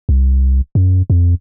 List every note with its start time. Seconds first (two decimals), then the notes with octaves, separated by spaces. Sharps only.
0.09 C2
0.75 F#2
1.10 F2